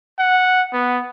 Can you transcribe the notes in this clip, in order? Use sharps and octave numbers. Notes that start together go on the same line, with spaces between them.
F#5
B3